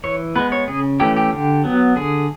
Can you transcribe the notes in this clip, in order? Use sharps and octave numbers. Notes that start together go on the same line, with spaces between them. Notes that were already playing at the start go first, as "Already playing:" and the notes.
E3 C#5
G#3 B3 B4
C#5
C#3 G#4
E3 A3 C#4 G4
G4
D3
F#3 B3
D3 G#4